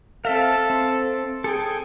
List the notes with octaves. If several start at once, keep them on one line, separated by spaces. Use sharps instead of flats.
C4 A4 E5 F5
C4
G#4 A4 G5